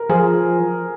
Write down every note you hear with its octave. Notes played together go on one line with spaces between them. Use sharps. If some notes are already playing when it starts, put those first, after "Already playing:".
Already playing: A#4
F3 G#4